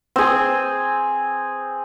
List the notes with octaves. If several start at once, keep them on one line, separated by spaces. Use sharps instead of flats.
C4 G#4